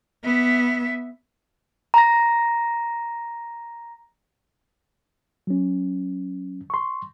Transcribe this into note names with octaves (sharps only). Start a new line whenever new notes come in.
B3 E5
A#5 A#6
F#3 C#4
C6 C#6